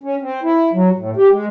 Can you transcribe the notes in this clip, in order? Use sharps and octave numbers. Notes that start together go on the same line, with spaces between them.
C#4
C4
E4
F#3
A2
G4
G#3